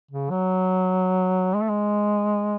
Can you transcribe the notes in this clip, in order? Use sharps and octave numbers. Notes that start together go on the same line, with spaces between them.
C#3
F#3
G#3
A3
G#3